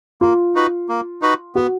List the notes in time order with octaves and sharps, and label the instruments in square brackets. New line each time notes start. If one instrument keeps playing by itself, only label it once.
[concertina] A#3 [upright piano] F4
[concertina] D#4 F#4 B4
A#3
D#4 F#4 B4
[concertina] B3 [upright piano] F#4